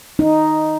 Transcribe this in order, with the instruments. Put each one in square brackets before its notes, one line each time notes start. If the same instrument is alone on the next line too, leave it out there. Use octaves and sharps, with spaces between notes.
[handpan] D#4